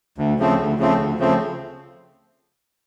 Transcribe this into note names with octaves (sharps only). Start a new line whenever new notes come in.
D2
C#3 F3 A3 C4
D2
C#3 F3 A3 C4
D2
C#3 F3 A3 C4